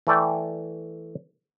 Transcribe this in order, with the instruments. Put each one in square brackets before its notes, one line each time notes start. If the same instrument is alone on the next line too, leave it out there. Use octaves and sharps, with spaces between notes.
[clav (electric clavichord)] E3 A3 D5 G5